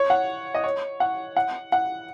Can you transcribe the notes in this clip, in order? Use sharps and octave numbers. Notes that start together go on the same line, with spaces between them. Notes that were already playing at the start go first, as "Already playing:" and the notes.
Already playing: C#5
F#5
D#5
C#5
F#5
F#5
F#5